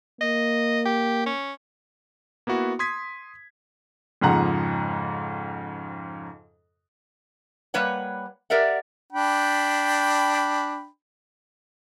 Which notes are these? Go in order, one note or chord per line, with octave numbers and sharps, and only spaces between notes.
A#3 D#5
G4
C#4
A#3 B3 E4 F#4
C6 D#6 G#6 B6
F2 G#2 C#3 F3 F#5 A#5
G3 A#3 B4 C#5 F#5
G4 A#4 D5 E5 F#5
D4 G5 B5